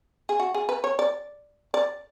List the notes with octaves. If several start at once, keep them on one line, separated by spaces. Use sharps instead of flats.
G#4
F#4
G#4
B4
C#5
D5
D5